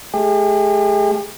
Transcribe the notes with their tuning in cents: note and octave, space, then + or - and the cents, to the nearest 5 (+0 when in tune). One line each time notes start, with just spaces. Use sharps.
A3 -40 G4 +45